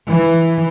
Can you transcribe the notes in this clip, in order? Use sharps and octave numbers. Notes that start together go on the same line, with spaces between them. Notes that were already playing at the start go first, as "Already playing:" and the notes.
E3